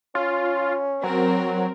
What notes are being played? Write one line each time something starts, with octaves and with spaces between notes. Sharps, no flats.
C#4 F4
F#3 C4 A#4